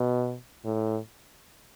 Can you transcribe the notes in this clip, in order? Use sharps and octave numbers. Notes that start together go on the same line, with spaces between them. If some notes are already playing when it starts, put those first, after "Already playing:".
Already playing: B2
A2